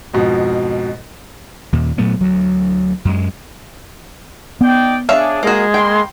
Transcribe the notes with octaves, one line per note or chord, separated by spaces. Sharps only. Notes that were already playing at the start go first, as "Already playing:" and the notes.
F2 G#2 B2
D#2 A#2
A#2 F#3 A3 B3
D2 F#3
F#2 G#3
B3 D#4 D5 G5
D4 G#4 C#5 E5 F5
G#3 A#3 F#4 A#4 D#5
A#3 G5 B5 C6